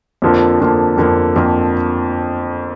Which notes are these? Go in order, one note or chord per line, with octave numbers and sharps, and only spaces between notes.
F2 D3 F3 A#3
F2 D3 F3 A#3
F2 D3 F3 A#3
F2 D3 F3 A#3